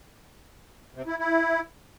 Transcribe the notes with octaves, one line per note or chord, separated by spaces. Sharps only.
C3
E4
E4